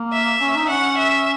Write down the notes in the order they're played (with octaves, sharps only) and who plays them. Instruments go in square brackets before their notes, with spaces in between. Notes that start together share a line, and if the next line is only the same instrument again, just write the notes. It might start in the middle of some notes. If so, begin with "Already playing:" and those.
Already playing: [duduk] A#3
[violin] E5
[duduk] C#4
D#4
[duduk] C#4 [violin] F#5
[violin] E5